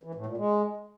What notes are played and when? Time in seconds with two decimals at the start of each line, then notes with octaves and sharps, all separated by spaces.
0.03 E3
0.15 A2
0.26 A#2
0.37 G#3